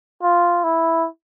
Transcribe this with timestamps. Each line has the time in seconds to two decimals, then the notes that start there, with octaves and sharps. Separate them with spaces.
0.22 F4
0.64 E4